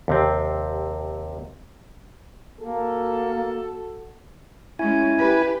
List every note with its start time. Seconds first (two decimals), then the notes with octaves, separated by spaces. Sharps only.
0.08 D#2 C3 C4
2.60 A#3 F#4 A4
4.79 G#3 C#4 E4 G#5
5.18 G4 B4